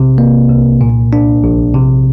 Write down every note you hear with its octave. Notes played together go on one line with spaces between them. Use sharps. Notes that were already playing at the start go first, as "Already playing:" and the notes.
Already playing: A#1 C3
A#3
C2
A#2
D4
A#1
C3